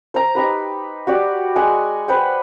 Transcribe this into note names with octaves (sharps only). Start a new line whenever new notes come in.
C5 A#5
D#4 G4 B4
F#4 G4 D5
G#3 F#5 G#5
B4 C5 F#5 G5